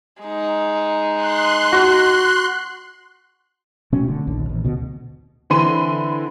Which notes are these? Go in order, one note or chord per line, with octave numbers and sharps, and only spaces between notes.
G#3 D#4
C6 F#6
F#4
B2 A3 C4 C#4
D3
A#1 D#2
A1
D2 B2
D3 E3 C4 B5 C6 D#7